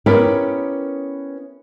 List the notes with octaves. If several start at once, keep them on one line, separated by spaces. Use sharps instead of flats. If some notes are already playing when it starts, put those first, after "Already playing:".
B3 C#4 E4 G4 A#4 B4